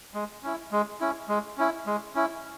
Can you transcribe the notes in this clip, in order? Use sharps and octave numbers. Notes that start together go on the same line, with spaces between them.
G#3
C#4 E4
G#3
C#4 E4
G#3
C#4 E4
G#3
C#4 E4